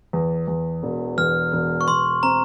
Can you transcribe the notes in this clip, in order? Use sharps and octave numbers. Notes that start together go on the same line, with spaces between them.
E2
E2
E1
E2 F6
E1
C#6
E1 C6
C4 A#5